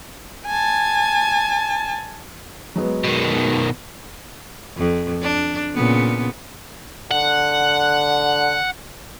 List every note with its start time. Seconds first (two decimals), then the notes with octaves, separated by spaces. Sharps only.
0.46 G#5 A5
2.76 F#3 G#3 B3
3.04 B2 D#3
4.77 F2
5.22 D4
5.75 A#2 C#3 B3
7.11 D3 F#5